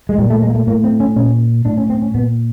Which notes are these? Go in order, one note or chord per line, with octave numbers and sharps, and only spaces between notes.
G#3
A#2 G3
A3
G#3
A#3
A3
A2 A#3
C4
C#4
A#2 C#4
A2 D4
C#4
C4
C#4
A#2 B3